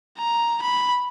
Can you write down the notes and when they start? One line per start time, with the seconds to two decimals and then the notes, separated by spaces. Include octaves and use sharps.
0.18 A#5
0.62 B5